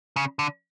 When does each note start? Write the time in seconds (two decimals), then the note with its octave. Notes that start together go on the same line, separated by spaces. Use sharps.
0.16 C#3
0.39 D3